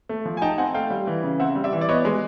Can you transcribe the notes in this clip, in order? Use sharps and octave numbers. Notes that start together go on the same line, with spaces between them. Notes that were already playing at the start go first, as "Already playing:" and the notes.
A3
F3
G#5
D#4 G5 A5
C4 F#5 G#5
A3 F5 G5
G3
E3
C#3
C4 E5 F#5
G3
D5 E5
E3
D5
B3 C#5 D#5
G#3